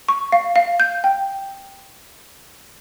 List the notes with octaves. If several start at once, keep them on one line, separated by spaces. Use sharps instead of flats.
C#6
F5
F5
G6
G5